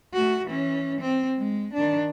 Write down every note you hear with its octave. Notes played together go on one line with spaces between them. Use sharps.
A3 F#4
E3 C#4
C4
G#3
D#3 D4